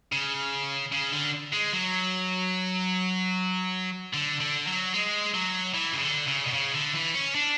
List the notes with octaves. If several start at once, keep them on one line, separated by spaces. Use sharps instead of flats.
C#3
C#3
D3
G#3
F#3
D3
D3
F#3
G#3
F#3
E3
C#3
D3
C#3
B2
C#3
D3
E3
C#4
D4